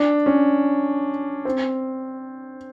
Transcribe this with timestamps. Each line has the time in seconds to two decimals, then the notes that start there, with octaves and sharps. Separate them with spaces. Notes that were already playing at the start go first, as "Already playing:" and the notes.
Already playing: D4
0.26 C#4
1.45 C4